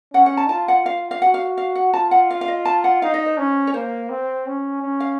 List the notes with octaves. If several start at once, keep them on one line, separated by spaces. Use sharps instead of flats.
C#4 F#5
F#5
A5
F4 A5
F#5
F4 F5
F5
F#4 F#5
F5
F5
F#5
F4 A5
F#5
F5
F5
D#5
A5
F#5
D#4 F5
D#5
C5
C#4
C#5
A#3 C5
C4
C#4
C#4
F5